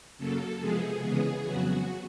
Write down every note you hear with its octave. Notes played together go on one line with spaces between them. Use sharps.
F#2 C#3 F#3 A#3 A4
C3 F3 G#3 B3 G#4
C#3 E3 G#3 B3 G#4
F2 C#3 F#3 B3 F#4